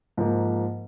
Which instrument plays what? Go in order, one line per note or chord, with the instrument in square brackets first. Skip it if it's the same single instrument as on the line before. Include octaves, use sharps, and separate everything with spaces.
[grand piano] G#2 F3 A#3